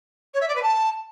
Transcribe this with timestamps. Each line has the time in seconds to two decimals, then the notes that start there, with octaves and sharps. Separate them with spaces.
0.33 C#5
0.40 E5
0.48 D5
0.55 B4
0.62 A5